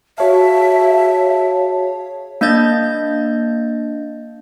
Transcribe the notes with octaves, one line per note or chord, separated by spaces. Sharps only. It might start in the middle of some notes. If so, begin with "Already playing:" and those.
F#4 G#4 C#5 E5 F5 A5
A#3 D4 D#5 G6 A6